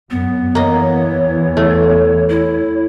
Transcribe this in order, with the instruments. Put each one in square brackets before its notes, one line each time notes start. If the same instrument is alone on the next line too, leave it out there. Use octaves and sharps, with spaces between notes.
[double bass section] F#2 [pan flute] B3
[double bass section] E2 E3 [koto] A#3 D#5 [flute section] C#5
[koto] A3
[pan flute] E4